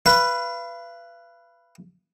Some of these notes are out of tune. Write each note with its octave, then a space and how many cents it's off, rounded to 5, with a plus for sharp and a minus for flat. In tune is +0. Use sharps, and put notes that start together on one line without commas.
B4 +0 F5 -40